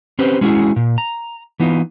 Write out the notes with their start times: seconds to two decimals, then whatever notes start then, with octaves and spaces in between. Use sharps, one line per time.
0.19 C4 C#4 G4 B4 C5
0.41 G#3 C#4 E4 F#4 G#4
0.76 A#2
0.98 A#5
1.60 E3 B3 D#4 F4